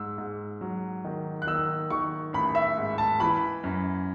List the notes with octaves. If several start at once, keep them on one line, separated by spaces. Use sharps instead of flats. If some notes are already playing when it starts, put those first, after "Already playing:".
Already playing: G#2 E6
G#2
F#3
D#3
F#6
D#3 E6
D#3 C#6
A1 B5
E5
G#2
A5
E3 B5
F#2